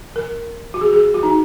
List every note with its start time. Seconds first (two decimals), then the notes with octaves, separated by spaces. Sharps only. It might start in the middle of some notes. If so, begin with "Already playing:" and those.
0.16 A#4
0.74 F#4
0.81 G#4
0.93 G#4
1.14 F#4
1.23 D#4